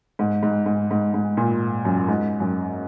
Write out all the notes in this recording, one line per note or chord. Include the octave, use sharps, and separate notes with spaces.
G#2
G#2
G#2
G#2
G#2
A#2
F#2
G#2
F#2